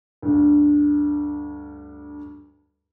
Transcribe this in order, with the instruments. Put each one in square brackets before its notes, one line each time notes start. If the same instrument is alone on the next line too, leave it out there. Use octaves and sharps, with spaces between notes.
[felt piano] D2 G2